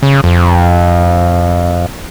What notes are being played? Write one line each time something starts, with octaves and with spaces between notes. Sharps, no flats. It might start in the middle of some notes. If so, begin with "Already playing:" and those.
C#3
F2